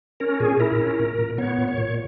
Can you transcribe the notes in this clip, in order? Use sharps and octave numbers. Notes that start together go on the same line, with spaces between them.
C#4 A#4
A#2 G#4
E4 A#4
C#4
A#2
A#2
B3 C#5
A#2
C#5
A#2